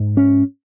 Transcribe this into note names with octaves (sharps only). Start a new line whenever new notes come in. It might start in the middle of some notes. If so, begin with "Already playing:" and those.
Already playing: G#2
C#4